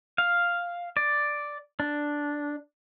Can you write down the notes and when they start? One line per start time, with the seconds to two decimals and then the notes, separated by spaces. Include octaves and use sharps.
0.18 F5
0.97 D5
1.80 D4